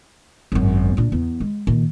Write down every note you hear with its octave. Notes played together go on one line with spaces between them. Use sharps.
G#1 F#2
A#2 D4
E2
G#3
A#2 D#3